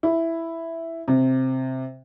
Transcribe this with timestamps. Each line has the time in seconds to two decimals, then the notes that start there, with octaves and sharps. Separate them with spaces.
0.03 E4
1.08 C3